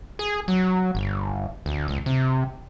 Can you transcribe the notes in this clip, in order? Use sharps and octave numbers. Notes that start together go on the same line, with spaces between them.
G#4
F#3
G1
D2
C#2
C3